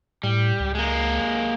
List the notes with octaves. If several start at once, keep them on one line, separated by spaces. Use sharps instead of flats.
A2 G3
C#2
G#3 A#3